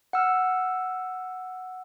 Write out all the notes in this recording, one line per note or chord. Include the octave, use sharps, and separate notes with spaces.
F#5 E6 F6